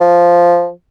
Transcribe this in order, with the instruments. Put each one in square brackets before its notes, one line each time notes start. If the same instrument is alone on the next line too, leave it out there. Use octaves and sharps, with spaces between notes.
[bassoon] F3